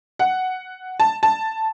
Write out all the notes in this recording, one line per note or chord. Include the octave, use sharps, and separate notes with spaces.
F#5
A5
A5